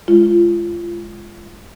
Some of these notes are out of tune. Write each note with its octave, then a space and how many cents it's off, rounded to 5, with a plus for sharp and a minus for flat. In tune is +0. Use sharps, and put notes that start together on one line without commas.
G#3 +0 F4 -25